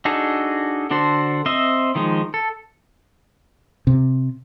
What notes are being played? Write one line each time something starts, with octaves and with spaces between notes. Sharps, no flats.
D4 D#4 F#4 G#4 A4
D3 D4 F#4 A4 C5
C4 C5 D#5 E5
D#3 F3 G#3 D#4
A4
C3